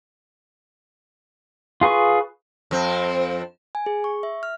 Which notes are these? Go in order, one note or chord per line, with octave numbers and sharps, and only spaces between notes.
F4 G#4 B4 C#6
F2 C4
G#5
G#4
C#6
E5
F6